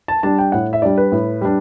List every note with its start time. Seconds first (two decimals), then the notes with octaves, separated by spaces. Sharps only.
0.08 A5
0.23 G3 D4 A5
0.39 G5
0.52 A2 F#5
0.73 E5
0.82 G3 D4 D5
0.98 B4
1.12 A2
1.41 G3 D4